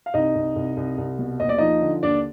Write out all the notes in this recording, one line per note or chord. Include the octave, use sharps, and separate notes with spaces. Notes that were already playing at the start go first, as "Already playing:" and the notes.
F5
C2 D#4 D#5
C2
C2
C2
C2
B2
D#2 D#5
D5
F3 D#4 D#5
D3
D#2 D4 D5